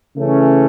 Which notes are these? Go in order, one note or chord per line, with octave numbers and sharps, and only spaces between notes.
C#3 E3 A3 C#4